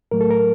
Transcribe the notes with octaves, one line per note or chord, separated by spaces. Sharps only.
A2 F#3 A3 A#4
A4
A#4